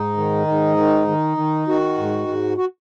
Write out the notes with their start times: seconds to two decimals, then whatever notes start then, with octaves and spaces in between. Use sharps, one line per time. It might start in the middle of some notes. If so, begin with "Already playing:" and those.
Already playing: G#2 D#4
0.17 D#3
0.47 G#2
0.77 D#3
1.08 D#3
1.37 D#3
1.68 D#3 F#4
1.98 G#2
2.28 G#2
2.57 F#4